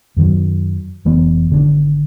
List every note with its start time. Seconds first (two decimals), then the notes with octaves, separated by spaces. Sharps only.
0.17 F#2 D#3 E3 F#3
1.05 F1 E3 A3 B3
1.50 G#1 D3 D#3 D4